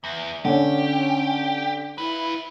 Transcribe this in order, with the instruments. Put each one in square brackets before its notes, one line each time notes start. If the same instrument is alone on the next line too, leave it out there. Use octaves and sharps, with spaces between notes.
[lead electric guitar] E2 [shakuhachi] E5
[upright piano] D3 C#5 [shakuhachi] C#4 [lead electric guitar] G4
[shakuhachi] E4 [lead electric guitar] F4 B4